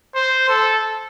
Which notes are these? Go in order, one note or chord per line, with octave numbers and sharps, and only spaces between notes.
C5
A4